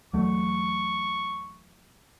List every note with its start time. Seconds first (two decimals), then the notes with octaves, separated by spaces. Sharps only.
0.13 E2 F#3 A3 C#6